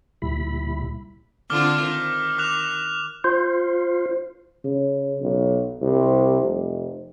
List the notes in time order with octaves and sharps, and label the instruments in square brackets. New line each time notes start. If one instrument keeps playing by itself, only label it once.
[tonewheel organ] D2 A#2 G3 E4 B5
[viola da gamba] D3 C4 F4 [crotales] D6 F6 G7
[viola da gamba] D#3
[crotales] D6 F#6 F7
[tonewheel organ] F4 C5
[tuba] C#3
B1
C2
F1